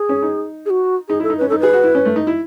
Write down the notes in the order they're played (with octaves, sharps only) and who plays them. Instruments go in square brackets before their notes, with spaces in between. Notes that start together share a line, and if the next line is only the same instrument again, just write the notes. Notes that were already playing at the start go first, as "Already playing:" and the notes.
Already playing: [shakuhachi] G#4
[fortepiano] C#4
D#4
[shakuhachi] G#4
F#4
[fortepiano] D#4 [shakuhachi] G#4
[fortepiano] E4 [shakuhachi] A4
[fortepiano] D#4
[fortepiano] C#4 [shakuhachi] B4
[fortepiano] D#4 [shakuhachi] A4
[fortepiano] G#4 [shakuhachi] B4
[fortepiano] F#4
E4
C#4
A3
D#4
E4